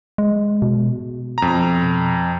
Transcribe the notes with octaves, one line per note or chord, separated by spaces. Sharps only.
G#3
B2
F2 A#5